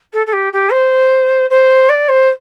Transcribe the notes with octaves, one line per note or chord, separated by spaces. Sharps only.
A4
A4
G4
G4
C5
C5
D5
C5